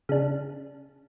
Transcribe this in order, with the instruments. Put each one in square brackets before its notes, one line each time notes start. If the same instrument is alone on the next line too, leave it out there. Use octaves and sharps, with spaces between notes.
[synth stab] C#3 D4